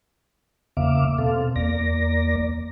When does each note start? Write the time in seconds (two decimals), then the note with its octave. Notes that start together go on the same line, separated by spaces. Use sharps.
0.77 E2 C#3 A#3 E5 F5 D6
1.18 B2 C4 A4 F5
1.56 E2 A#3 D5 A#6